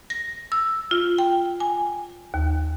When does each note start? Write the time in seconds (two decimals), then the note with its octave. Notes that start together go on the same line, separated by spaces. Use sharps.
0.10 A#6
0.52 E6
0.91 F4
1.18 G5
1.60 G#5
2.34 D#2